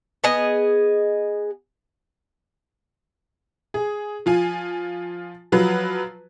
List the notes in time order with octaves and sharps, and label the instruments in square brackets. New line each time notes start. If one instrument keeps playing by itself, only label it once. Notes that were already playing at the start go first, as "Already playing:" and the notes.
[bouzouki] B3 G#4 D#5
[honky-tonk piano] G#4
F3 F4 G#5
F3 F#3 F4 B4